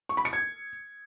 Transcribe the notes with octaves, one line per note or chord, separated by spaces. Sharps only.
C#6
B5
C#7
G#6